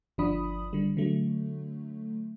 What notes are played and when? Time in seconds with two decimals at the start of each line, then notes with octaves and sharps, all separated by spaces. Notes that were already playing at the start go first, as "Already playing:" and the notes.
0.18 G1 F3 D4 B5 D#6
0.73 D3 G3
0.97 D3 F#3 A3